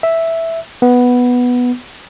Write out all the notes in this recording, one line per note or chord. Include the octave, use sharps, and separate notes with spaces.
E5
B3